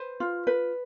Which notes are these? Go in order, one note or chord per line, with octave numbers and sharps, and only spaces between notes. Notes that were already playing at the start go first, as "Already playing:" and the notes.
Already playing: B4 C5
F4
B4